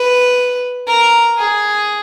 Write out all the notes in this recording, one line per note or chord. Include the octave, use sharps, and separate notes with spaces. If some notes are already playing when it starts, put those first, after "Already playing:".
Already playing: B4
A#4
G#4